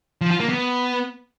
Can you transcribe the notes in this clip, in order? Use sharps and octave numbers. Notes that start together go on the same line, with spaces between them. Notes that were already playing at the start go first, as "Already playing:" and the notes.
F3
F4
A#3
B3